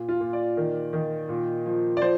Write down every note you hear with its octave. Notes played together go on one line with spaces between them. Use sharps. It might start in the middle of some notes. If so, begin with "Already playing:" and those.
Already playing: A#2
F4
A#2
D5
D#3
D#3
A#2
F3
D5
F3 C5